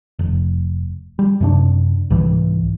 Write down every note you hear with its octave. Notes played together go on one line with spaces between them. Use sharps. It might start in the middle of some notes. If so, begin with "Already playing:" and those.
F1
G3
F#2 C3 D4
C2 G#2 E3